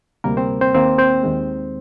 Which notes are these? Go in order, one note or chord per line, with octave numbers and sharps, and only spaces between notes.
D2 C3 G3 A#3 A#4
C4 C5
C4 C5
D#2 D#3 A#3 C4 C5
C4 C5
D#2 D#3 G#3